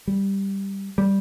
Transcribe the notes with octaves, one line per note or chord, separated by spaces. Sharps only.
G3
G3